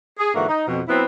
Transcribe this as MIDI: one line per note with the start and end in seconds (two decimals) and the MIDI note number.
0.19 0.34 68
0.34 0.47 44
0.34 0.47 50
0.34 0.47 52
0.34 0.47 58
0.34 0.47 66
0.48 0.67 63
0.67 0.81 41
0.67 0.81 47
0.88 1.04 54
0.88 1.04 59
0.88 1.04 60
0.88 1.04 64